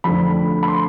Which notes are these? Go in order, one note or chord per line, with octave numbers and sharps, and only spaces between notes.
F2 D3 A3 D4 B5
B5
C6